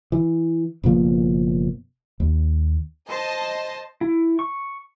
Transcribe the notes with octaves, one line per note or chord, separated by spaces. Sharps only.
E3
F#1 B2 F3 A#3
D#2
C5 D#5 A5
E4
C#6